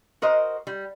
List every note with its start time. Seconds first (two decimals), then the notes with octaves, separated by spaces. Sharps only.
0.22 F#4 A#4 C5 D#5
0.67 G3